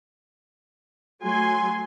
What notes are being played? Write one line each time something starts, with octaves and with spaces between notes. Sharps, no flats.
F#3 A3 G#5 C6